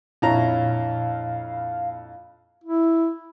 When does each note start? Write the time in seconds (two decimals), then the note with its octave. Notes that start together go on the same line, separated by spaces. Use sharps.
0.22 F2 A#2 D4 E4 C#5 F5 A#5 B5
2.64 E4